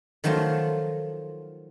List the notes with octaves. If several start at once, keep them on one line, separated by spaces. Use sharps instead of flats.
D#3 F3 F#3 A3 F4